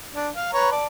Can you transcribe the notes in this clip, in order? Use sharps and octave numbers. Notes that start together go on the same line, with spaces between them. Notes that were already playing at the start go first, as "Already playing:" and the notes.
D4
F5
B4 C#5 A#5
D5 A5